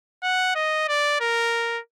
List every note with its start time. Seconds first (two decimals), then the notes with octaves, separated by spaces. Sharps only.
0.23 F#5
0.55 D#5
0.88 D5
1.21 A#4